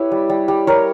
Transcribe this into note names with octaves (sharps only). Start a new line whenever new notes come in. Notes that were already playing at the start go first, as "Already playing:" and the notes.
Already playing: E4 G4 B4 C#5
G3
G3
G3
G3 A#4 C#5